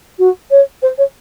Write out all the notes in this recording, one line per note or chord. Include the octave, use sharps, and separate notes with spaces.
F#4
C#5
C5
C#5